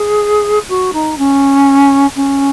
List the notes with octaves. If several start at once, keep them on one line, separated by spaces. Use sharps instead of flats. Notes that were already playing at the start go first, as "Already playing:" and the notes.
Already playing: G#4
F#4
D#4
C#4
C#4